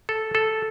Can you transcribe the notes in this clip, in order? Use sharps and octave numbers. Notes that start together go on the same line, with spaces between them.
A4
A4